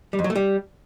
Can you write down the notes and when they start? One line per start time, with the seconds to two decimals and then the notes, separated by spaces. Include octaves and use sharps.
0.13 G3
0.19 F2
0.24 F#3
0.30 A3
0.36 G3